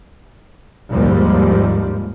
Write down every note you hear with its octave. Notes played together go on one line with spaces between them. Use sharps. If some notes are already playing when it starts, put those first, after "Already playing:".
D#2 G#2 F3 G3